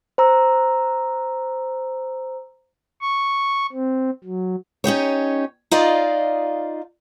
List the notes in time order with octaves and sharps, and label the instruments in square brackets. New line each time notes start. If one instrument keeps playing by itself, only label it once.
[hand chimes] C5 A#5 E6
[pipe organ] C#6
C4
F#3
[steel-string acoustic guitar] C#4 D#4 G4 C#5
D#4 F4 D5 D#5 F5